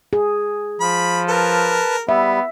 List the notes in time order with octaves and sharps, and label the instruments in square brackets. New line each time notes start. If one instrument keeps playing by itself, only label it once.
[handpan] G#4
[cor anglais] F3 [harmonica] B5
[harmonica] A#4 [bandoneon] B4 A5
[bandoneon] G3 [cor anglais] B3 [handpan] E5